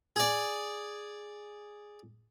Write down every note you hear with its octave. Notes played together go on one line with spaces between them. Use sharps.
G#4 D5